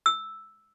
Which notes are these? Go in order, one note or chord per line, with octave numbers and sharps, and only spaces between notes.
E6